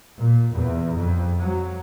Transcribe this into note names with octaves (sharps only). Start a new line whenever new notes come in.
A#2
E2
F2
F#3